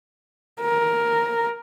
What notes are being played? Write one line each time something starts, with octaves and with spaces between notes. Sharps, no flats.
A#4